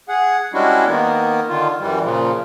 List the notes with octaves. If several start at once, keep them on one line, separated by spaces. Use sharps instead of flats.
G#4 F#5
G3 G#3 C#4 D4 E4 F#4
D#3 A#3 B3
D3 D#3 F4
F#2 E3 G3
A#2 C#3 F3